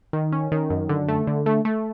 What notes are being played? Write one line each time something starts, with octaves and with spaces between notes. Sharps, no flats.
D#3
C#4
D#3
F#2
D3
A3
D3
A3
A3